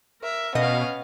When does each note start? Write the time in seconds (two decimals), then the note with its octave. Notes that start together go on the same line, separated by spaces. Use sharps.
0.21 A#4 E5
0.55 B2 B3 C#4 D#5 F5